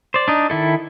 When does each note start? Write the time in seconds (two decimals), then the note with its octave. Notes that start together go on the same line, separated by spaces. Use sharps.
0.14 C5 D5
0.28 D4 D#4
0.50 D#3 E4 A4